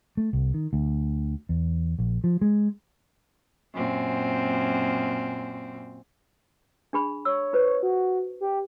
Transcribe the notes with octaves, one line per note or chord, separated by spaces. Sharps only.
A3
C2
D#3
D2
E2
A#1
F3
G#3
F#2 A#2 C4
D4 G#4 B5
C#5 E6
F4 B4 C5
F#4
G4